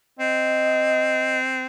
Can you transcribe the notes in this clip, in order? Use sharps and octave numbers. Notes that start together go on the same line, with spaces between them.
C4 D#5